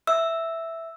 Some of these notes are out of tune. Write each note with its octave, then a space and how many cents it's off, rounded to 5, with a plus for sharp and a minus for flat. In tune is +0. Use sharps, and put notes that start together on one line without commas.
E5 +0 E6 +0